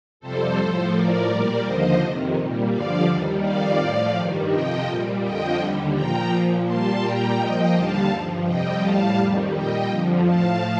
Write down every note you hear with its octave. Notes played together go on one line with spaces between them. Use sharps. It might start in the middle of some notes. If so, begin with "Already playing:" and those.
F2 C3 G3 A4 C5
A2 F3 A4 C5
A2 F3 A#4 D5
A#2 G3 A#4 D5
D#2 D3 F3 C5 D#5
F2 C3 D#3
A#2 G3
G2 D3 F3 D5 F5
D#2 D#3 G3
F2 D#3 G3 D5 F5
A2 F3 D5 F5
G2 D#3 G3
F2 C3 F3 D#5 G5
A#2 G3
F2 D3 F3 D#5 G5
D#2 D3 G3
A#2 F3 G5 A#5
A#2 F3
A#2 G3 A5 C6
A#2 G3 G5 A#5
A#2 F3 D#5 G5
D#2 D3 G3 F5 A5
G2 F3
F2 C3 G3 D#5 G5
A2 G3 F5 A5
F2 D#3 G3
A#2 G3 D#5 G5
F2 D3 F3
A2 F3 F5 A5